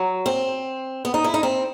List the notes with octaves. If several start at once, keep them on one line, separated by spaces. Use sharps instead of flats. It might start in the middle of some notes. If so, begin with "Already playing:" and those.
Already playing: F#3
C4
B3
D#4
E4
D#4
C4